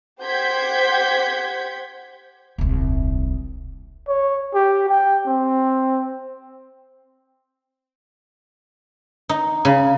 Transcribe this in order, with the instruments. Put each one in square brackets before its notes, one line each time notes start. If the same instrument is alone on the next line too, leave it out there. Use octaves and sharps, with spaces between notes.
[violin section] G4 C5 F#5 G6 G#6 B6
[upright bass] D#1 C2
[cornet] C#5
G4
G5
C4
[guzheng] D#4
C#3